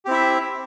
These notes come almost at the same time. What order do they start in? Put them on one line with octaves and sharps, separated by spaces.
G4 C4 E4 E5